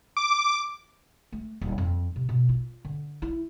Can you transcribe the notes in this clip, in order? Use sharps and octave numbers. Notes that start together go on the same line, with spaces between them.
D6
A3
D#1
F2
C3
B2
F4
D3
E4